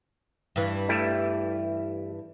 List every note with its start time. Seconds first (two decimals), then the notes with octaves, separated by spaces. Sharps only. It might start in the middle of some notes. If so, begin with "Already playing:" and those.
0.56 G2 E3
0.89 G3 A3 E4